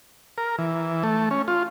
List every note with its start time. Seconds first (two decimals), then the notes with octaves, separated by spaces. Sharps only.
0.38 A#4
0.58 E3
1.03 A3
1.31 C#4
1.48 F4